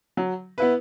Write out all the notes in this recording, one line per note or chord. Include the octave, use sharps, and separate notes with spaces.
F#3
B3 E4 B4